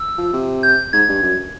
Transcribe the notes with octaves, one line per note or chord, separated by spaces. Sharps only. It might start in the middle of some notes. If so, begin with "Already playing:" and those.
Already playing: E6
F3
C3
G6
G#2 G#6
G2
F#2